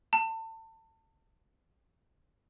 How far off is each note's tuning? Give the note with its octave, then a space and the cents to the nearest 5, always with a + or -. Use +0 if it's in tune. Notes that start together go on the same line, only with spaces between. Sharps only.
A5 +30